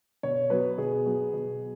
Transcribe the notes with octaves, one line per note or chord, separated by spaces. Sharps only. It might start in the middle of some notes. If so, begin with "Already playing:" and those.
B2 C#5
F#3 B3 B4
B2 G#4
F#3 B3
B2